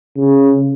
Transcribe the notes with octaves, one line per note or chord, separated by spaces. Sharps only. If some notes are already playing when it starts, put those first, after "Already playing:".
C#3